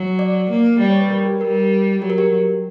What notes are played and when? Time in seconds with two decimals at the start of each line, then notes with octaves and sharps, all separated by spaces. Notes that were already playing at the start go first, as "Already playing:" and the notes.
Already playing: F#3
0.19 D5
0.50 A#3
0.80 G3 D5
0.90 C#5
1.01 B4
1.10 A#4
1.25 G4
1.41 G3 A#4
2.02 F#3 G4
2.10 A#4
2.18 G4